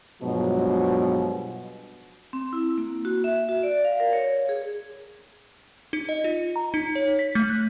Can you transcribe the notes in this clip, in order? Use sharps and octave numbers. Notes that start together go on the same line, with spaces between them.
G2 B2 F3 F#3 G#3
C4
E4
A#3
F#4
E5
F#4
D5
F5
A#4
C#5
G#4
D#4
D#5
F4
A#5
D#4
C#5
B6
A3
F#6